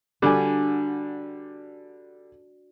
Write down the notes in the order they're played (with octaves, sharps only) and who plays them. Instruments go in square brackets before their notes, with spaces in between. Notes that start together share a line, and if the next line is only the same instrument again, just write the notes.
[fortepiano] D3 G3 [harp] D4 F#4 G#5